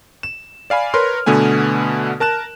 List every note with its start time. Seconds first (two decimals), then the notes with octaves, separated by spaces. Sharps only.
0.23 E7
0.70 D5 F5 G#5 B5
0.94 A#4 B4 C#5 C6 F6
1.26 B2 D3 A3 B3 G#5
2.20 A#4 A5 F#6 E7